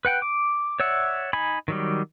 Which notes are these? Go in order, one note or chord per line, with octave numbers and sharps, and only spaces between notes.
B4 F#5 G5
D6
C#5 D5 E5 F#5
D#4 G#5 B5
D#3 F#3 G3